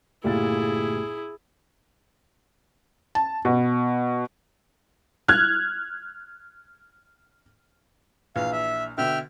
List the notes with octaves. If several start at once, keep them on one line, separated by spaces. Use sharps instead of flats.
G1 A#2 A3 E4 G4 G#4 A6
A5
B2
F6 F#6 G#6
A#1 E3 F5
E5
B2 D3 E5 G5 F6